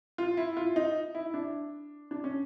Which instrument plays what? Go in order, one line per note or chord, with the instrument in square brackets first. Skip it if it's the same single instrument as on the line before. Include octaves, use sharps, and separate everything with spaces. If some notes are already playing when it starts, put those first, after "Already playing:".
[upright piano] F4
E4
F4
D#4
E4
D4
D4
C#4